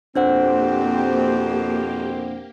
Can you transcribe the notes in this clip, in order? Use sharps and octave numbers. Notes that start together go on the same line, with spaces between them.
F2 B2 A#3 C4 D4 G4 C5 F#5